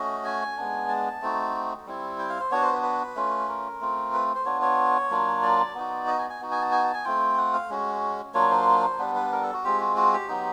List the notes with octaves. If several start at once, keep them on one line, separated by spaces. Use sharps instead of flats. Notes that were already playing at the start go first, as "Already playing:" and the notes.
Already playing: A3 C#4 F#4 D#5
G#5
G#3 B3 D4
A5
A3 C4 D#4 F#4
G3 C4 E4
G5
F5
C5
B3 D4 F#4 C#5
C5
B4
B4
A3 C#4 F4
A#4
A3 C4 F4
B4
C5
B3 D4 F4 C#5
C#5
F#3 A#3 D4 F4
D5
B3 D#4 F#4
D#5
G#5
G#5
B3 D#4 F#4
G#5
A5
G#5
A5
G#5
A3 C4 F4 G5
F#5
F5
G#3 C#4 F#4
F#3 A#3 D4 F4 C#5
C5
G3 B3 D4 B4
B4
A#4
A4
F#4
G#3 C4 F4 G4
F#4
F#4
G4
F#3 B3 D#4